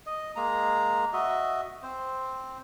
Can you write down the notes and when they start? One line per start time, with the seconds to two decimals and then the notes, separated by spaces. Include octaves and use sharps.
0.06 D#5
0.36 G#3 A#3 A#5
1.13 F#4 D#5 E5
1.83 C4 C5